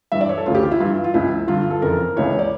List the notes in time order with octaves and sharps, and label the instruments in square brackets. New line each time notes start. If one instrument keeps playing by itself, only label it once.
[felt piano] G2 E3 E5
D5
C#5
A4
D2 C#3 E3 F4
G4
F4
E4
G2 E3 F4
F4
C#2 C#3 E3 E4
G2 D3 F4
A4
F2 C#3 E3 A#4
C#2 C#3 E3 C#5
D5